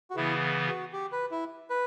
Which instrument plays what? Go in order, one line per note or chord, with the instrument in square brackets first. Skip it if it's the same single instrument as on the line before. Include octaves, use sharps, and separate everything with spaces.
[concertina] F#4
[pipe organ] C#3 E3 B3 [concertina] E4
[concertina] F#4
G4
B4
E4
B4